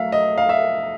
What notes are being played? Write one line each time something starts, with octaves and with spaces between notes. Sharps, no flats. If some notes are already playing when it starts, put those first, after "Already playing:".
Already playing: F#3 A3 E5 F5
D#5
F5
E5